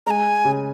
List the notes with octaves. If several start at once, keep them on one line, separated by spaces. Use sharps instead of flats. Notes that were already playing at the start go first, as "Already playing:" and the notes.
G#3 G#5 A#5
C#3